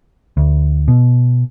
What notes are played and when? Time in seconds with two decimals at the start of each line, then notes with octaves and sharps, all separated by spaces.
0.37 D2
0.88 B2